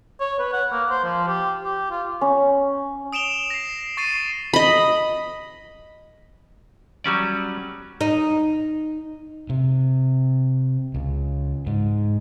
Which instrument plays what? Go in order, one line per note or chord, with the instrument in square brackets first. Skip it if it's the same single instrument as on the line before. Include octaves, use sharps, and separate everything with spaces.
[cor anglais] C#5
B4
F#5
A#3
C5
F3
G4
G4
F4
[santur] C#4
[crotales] D#6 D7 E7 F7 G7
A#6 C7
C#6 A6 C7 D#7
[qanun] D#5 B5
[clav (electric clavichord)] F#3 G3 C#4 D5
[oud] D#4
[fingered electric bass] C3
C#2
G#2